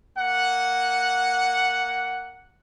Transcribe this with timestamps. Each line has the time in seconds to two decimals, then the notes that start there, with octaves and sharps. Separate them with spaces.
0.17 A#3 F#5